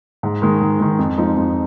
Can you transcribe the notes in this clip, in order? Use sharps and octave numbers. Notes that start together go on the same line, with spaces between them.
G#2
D#3 G#3
G#2
D#3 G#3
F2
F3 G#3 D#4
F2